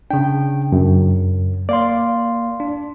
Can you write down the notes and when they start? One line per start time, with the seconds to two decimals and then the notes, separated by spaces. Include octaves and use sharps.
0.11 C#3 D4 G5
0.72 F#2
1.69 A#3 D5 F5 C6
2.60 D4